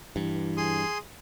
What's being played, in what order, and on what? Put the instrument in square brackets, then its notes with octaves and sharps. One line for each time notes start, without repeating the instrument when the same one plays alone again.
[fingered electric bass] G2 [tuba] E3
[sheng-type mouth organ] G#4 C6 D#6